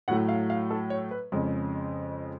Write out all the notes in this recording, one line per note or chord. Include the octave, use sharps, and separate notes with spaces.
A2 F#3 A3 F#5
F5
F5
A4
C#5
B4
F2 C#3 G#3